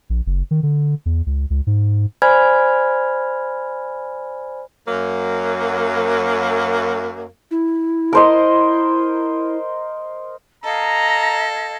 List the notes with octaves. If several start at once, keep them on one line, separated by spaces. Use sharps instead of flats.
A#1
F#1
D#3
D3
E2
C#2
C#2
G#2
C5 D5 G#5 B5 F6 G#6
F#2 F#3 A#3
E4
A#4 C5 D#5
A4 D#5 F5 A#5 G#6